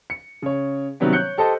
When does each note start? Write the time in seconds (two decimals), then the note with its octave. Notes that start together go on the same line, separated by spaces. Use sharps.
0.10 C#7
0.42 C#3 C#5
1.00 C3 D#3 F#3 G3 B3 C#4
1.13 C#5 F#6 G6 C#7
1.38 G4 A4 C5 D#5 A5